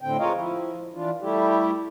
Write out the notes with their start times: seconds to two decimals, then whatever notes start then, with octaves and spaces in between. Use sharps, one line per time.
0.01 A2 D3 C4 G5
0.19 G#3 F4 A#4 C#5 D#5 F5
0.36 F3 E4
0.94 E3 D4 F4
1.21 G3 A3 E4 G4